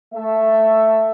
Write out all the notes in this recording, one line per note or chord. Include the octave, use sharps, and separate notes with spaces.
A3 E5